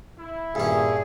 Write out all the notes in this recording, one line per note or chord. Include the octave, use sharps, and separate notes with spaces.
E4
G2 A#2 C#4 G#4